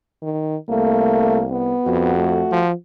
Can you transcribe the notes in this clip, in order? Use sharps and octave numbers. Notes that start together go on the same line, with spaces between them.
D#3
C2 A3 A#3
B3
F2 F#4
A3
F3